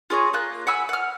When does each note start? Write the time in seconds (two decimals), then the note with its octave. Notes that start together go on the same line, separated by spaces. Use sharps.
0.10 F4 G#4 C#5 A#5
0.33 A#3 F4 F#6
0.67 F#5 G#5 B5 E6
0.89 F#5 F6